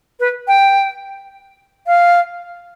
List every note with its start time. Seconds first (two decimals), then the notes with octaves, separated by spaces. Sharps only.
0.20 B4
0.48 G5
1.86 F5